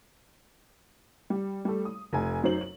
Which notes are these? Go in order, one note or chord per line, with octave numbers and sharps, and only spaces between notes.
G3
G3 A3
D#6
F1 G#5
F#2 F#3 D#4 C5 F#7
F#7